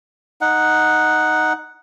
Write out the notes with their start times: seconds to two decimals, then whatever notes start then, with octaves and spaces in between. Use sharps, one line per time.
0.41 D#4 F#5